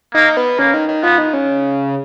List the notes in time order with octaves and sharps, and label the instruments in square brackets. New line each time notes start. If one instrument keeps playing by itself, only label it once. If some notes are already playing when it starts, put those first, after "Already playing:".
[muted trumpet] A#3 [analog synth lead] D#4
[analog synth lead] B3
[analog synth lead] C#3 [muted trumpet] A#3
[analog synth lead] D#3
D#3
[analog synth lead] F3 [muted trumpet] B3
[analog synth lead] D#3
C#3